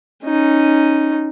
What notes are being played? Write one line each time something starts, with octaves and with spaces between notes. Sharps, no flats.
C#4 D#4